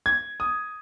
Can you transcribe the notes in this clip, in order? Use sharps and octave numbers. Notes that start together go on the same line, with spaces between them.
G#6
D#6